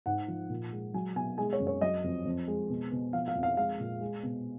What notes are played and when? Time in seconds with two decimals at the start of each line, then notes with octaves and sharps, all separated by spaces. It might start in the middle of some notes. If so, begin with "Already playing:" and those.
0.06 G#2 F#5
0.28 F3
0.50 A#2
0.72 G#3
0.94 F#3 G#5
1.16 B2 G#5
1.38 G#3 G#5
1.53 C#5
1.60 F#2
1.67 C#5
1.81 F#3 D#5
2.04 F2
2.25 F2
2.48 G#3
2.69 B2
2.92 B2
3.13 F3 F5
3.28 F5
3.35 F2
3.43 F5
3.57 G#3 F5
3.80 A#2
4.01 G#3
4.23 B2